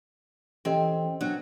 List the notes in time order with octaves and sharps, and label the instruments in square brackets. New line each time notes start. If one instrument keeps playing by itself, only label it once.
[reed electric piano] E3 C#4 A4 [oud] C4 [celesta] G4 D#5
[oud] F#3 [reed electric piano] B3 D4